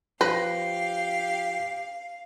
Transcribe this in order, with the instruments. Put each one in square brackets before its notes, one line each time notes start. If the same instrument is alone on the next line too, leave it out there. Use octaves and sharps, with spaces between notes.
[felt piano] F3 C5 A#6 [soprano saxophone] G4 [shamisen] B4 [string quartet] F5